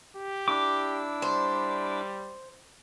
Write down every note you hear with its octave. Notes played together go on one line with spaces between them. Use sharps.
G4
D4 E4 D6 E6
G3 C5